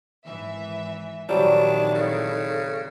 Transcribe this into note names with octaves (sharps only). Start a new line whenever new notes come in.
G#1 E3 E5
A#1 D#3 F#3 G3 C4 D4 E4 D5
C#3 A4